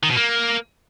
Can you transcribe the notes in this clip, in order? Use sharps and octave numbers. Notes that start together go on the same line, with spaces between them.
D#3
B2
A#3